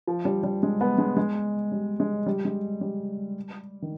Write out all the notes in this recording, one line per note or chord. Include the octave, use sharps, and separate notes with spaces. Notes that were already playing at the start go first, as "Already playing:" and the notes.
F3
G3
G3
G#3
B3
G#3
G#3
G3
G#3
G3
G#3
G3
D#3